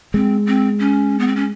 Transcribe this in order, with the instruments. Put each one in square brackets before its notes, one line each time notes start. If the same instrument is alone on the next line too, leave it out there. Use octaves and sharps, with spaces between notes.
[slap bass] G#3 [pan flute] C4
[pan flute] C4
C#4
B3
C4
C#4